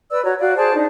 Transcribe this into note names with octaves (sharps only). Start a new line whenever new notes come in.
B4 D5 E6
F#4 C#5 A#5
F#4 D5 F5
G#4 C5 D5 A5
D4 D#4